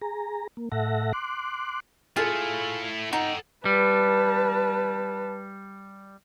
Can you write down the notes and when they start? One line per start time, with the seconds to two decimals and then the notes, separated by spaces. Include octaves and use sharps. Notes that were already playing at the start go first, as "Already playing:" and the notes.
0.01 G#4 A#5
0.57 A#3
0.72 A2 A4 E5 F#5 A#6
1.13 C6 D6 F#6
2.16 A3 E4 F4 G#4 A4 G#5
3.13 D#4 A4 F#5 G5 A#5
3.65 G3 B4 A5